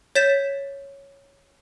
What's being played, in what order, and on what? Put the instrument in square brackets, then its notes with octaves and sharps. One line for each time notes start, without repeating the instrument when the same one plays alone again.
[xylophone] C#5 G6 A6 B6 E7